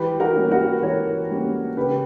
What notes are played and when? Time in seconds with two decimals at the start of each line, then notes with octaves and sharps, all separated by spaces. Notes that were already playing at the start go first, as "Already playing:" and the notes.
Already playing: E3 G4 B4
0.20 F#4 A#4
0.36 G3 A#3 C#4
0.51 F#4 A#4
0.82 E3 A#4 C#5
1.30 G3 A#3 C#4
1.77 C#3 G4 B4